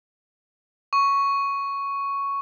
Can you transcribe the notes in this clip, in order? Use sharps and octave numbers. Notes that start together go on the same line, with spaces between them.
C#6